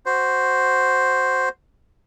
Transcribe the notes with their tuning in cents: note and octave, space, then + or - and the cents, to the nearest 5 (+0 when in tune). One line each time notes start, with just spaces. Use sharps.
F#4 +0 C5 +0